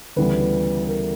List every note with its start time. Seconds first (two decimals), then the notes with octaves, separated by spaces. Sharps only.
0.16 D2 C#3 E3 G3 B3 B4
0.89 A#4